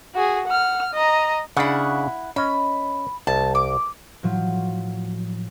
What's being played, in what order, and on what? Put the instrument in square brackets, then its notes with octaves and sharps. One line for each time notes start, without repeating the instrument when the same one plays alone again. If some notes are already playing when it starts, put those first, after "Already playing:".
[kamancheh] F#4 G#4
F#5 F6
D#5 A#5
[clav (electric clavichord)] C#3 D4 [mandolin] E4 F#5
[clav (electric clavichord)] C#4 D#5 [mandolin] B5
[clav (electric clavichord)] C2 [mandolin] A5
[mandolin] D6
[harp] A2 F3 F#3